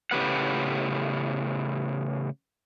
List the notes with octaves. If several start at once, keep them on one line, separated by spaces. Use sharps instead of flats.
A2 C#3 G4 B4 F#5